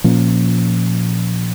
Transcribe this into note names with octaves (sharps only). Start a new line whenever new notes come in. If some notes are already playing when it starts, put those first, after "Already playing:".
A#2 F3 A#3 C#4